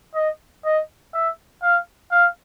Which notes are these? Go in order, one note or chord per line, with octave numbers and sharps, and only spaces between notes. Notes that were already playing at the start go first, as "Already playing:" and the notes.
D#5
D#5
E5
F5
F5